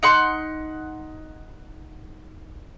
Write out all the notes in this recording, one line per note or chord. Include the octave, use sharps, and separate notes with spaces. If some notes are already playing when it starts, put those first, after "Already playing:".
D#4 F#5 C6